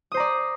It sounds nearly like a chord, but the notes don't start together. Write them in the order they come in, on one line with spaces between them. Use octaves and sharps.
D#6 C5 A#5 D5